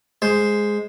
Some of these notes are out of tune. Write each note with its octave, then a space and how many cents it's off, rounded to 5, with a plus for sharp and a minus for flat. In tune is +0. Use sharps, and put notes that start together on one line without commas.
G#3 +0 C5 +0